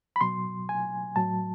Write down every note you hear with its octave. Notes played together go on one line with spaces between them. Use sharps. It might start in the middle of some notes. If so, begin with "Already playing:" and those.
B5
B2 F#3 C6
G#5
A2 F#3 A5